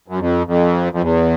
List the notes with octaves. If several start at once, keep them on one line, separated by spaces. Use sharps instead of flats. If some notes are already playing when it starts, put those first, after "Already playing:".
F#2
F2
F2
F2
E2